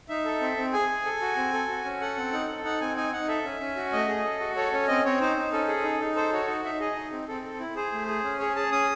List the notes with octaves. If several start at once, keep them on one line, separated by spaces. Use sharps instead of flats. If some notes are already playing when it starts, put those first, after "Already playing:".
D#4 E5
A4
C4
C4
G#4 G#5
G#4
A4
F#4
C4
A4
F#4
C#4
A4 F#5
C4
D#4
A4
D#4 F#5
C4 G#5
D#4 G#5
D#4 F#5
A4 E5
C#4
C#4
F#4
A3 D#5
G#4
A4
F#4
A4 C#5
C#4 C#5
C4 D#5
C4 C#5
D#4 C5
D#4
C#4 A4
G#4
D#4
D#4
A4 C5
F#4 C#5
D#4
D#4 E5
G#4 D#5
D#4
C4
C4 A4
A4
E4
G#4 C5
A3
G#4
C#4
G#4 C#5
G#4 A5
C#4 D#6